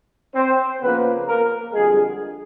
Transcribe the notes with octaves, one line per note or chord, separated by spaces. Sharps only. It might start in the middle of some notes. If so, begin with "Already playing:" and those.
C4 C5
C#3 F3 A#3 B3 B4
A#3 A#4
F2 D3 G3 G#3 G#4